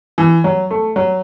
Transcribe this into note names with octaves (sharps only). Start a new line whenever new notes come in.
E3
F#3
A3
F#3